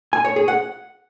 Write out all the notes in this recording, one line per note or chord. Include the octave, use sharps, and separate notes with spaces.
G#5
C#5
G#4
F#5